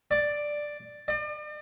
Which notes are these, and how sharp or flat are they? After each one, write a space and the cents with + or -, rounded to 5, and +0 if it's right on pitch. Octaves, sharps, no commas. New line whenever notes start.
D5 +5
D5 +40